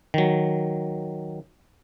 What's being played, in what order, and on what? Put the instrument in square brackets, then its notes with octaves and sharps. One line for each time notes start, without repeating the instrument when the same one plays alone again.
[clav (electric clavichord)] D#3 F#3